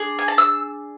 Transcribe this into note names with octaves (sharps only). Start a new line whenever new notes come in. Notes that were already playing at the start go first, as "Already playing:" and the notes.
Already playing: D4 G#4
G#5
A5
E6